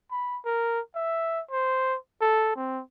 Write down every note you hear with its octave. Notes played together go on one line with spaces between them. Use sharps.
B5
A#4
E5
C5
A4
C4